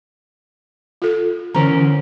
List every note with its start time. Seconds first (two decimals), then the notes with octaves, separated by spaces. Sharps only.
1.02 F4 A4
1.55 D3 E3 C#4 A#4 A#5